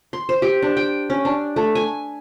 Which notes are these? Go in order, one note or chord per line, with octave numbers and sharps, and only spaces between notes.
C6
C5
G4
D4
G5
C#4
D4
A3
G#5